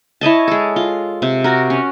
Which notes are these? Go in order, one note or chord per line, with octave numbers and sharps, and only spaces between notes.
E4 C#5 D#5 A5
G#3 A4
F4
C3
F#4 A#4
C#4